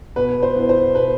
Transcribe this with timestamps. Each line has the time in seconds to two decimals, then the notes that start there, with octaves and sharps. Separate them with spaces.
0.16 B2 B4
0.43 C5
0.55 B3 E4
0.69 C5
0.95 B2 B4